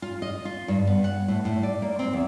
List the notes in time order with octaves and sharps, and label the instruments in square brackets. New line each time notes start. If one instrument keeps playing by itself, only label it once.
[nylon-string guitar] F4
D#5
F4
G2
B3
F#5
A2
A2
D5
A#3
C4
E2